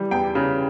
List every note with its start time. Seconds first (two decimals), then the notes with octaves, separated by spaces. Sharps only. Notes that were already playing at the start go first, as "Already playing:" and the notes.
Already playing: E3 G3
0.11 E2 G5
0.35 C#3